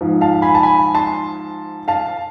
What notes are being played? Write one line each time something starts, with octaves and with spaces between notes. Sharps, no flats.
G#2 F3
F5 A5
G#5 B5
A5
G#5 B5
A5 C6
F5 A5